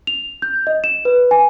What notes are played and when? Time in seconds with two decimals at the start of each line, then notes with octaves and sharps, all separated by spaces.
0.07 F7
0.42 G6
0.67 D#5
0.84 E7
1.05 B4
1.31 G#5